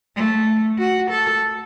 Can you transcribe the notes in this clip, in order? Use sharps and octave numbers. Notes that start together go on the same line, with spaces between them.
A3
F#4
A4